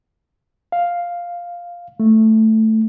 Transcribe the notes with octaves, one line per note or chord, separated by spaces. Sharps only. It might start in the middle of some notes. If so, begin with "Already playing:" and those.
F5
A3